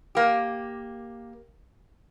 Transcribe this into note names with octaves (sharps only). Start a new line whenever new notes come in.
A#3 G4